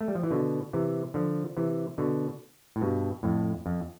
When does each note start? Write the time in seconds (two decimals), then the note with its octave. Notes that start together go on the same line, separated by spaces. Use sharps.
0.01 A3
0.08 G3
0.15 F3
0.23 E3
0.31 B2 D3
0.73 C3 E3
1.14 D3 F3
1.57 C3 E3
1.98 B2 D3
2.76 A2
2.81 G2 B2
3.23 F2 A2
3.66 F2